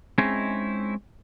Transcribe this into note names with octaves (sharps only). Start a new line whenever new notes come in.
G#3 C4 C#4 D#4 E4 G#4